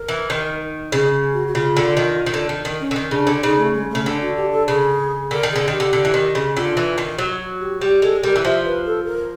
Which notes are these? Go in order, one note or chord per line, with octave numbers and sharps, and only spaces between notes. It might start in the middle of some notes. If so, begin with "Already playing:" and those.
Already playing: A#4
E3
D#3
C#3 G#4
F#4
F#4
C#3 F4
D3
D#3
D#3
D3
D#3
D#3
C#4
D3
D#3
C#3 D4
D3
C#3 D#4
A3
G#3
C#3 A3
D3 D4
F#4
G4
A4
C#3 G#4
D3 A#4
D#3
D3 G#4
D#3 G4
D3
D3
E3
D#3
C#3
D3 F4
E3
D#3
F#3 F#4
G4
G3 G4
G#3 A4
G3 A#4
E3
F3 E5
B4
A4
A#4